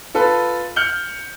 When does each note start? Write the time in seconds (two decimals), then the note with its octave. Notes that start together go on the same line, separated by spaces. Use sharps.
0.14 F4 A4 B4
0.76 F6 G6 C#7 F#7 G7